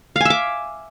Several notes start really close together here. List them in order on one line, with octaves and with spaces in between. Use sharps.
F5 G#5 E5 D6